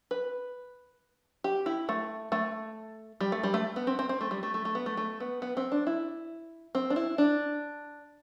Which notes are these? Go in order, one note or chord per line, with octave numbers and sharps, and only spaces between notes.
B4
G4
E4
A3
A3
G3
A3
G3
A3
B3
C4
C4
C4
A3
G3
A3
A3
A3
B3
A3
A3
B3
B3
C4
D4
E4
C4
D4
E4
D4